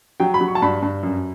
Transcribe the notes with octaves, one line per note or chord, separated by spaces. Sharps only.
F#3 G5
B5
F#3
C#6
A5
G2 B5
G2
F#2